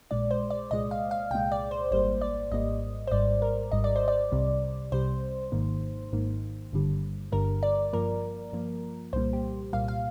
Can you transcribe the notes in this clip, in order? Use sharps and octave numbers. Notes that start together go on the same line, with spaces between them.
A#1 A#2 G#3 D5
C5
D5
C2 A#2 G#3 D#5
F5
F5
C2 A#2 G#3 G5
D5
C5
G#1 G#2 G3 A#3 C5
D5
G#1 G#2 G3 A#3 D#5
C5
G#1 G#2 G3 D5
A#4
G#1 G#2 G3 D#5
D5
C5
D5
C2 C3 G3
C2 C3 G3 C5
G#1 G#2 D#3 A#3
G#1 G#2 D#3 A#3
G1 G2 D3 G3
G1 G2 D3 G3 A#4
D5
G2 F3 A#3 A#4
G2 F3 A#3
C2 A#2 G3 A#3 C5
G4
C2 A#2 G3 A#3 F5
F5